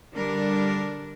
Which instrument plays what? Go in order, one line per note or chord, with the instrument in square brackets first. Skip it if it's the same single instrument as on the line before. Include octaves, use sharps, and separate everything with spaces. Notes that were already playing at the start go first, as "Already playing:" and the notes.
[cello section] D3 G3 D4 A#4